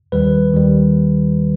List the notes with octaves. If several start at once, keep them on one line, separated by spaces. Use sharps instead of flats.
D#2 D#3 G3 B4
D#2 D#3 G3